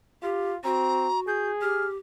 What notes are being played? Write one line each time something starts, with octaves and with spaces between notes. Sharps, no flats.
F4 G4
C4 F#4 A#5
G#4 G6
G4 F6